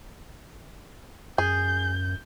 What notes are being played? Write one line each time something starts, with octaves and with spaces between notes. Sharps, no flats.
F#2 G#4 G6